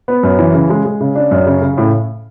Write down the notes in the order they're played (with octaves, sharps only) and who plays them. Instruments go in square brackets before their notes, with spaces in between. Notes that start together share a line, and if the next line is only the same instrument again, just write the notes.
[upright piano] B3
F#2
E3
C#3
G#3
G#3
C#3
D4
F#2
C#3
C#3
A2